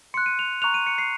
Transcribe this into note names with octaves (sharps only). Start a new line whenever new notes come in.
C6 F#6 C#7
D#7
F7
A#5 C#6 F#6 F7
D#7
C#7
C7